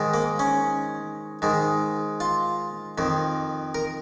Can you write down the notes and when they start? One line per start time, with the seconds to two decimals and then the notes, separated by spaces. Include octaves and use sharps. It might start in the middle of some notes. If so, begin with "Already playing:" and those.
Already playing: G#2 D#3
0.14 A#3
0.39 C#4
1.42 G#2 D#3
2.20 F4
2.98 F2 D#3
3.75 A#4